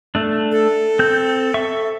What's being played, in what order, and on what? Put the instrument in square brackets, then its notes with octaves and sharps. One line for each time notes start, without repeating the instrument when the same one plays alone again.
[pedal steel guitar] A3 D4
[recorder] A4
[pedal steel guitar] C4 G6
E5 C#6